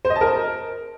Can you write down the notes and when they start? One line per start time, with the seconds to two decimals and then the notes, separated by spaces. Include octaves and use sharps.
0.05 C5
0.10 D#5
0.16 A5
0.21 A#4